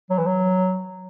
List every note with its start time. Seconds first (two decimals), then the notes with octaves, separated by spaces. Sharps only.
0.10 F#3
0.18 E3
0.26 F#3